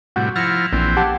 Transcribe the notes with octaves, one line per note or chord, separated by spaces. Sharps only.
A2 C3 G3 F#4
F3 E4 F6 A6 A#6 C#7
A#1 E3 C4
G4 F#5 A5